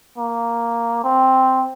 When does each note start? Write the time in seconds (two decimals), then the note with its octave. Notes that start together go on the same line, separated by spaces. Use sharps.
0.18 A#3
1.04 C4